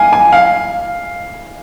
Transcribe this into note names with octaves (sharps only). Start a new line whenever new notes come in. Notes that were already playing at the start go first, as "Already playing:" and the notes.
Already playing: F5 G#5
G#5
F5